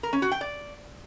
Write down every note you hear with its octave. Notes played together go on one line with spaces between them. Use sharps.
A#4
C#4
F#4
G5
D5